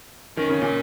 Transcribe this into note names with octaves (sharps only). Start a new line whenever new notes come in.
D#3 C#4
C#3
A#2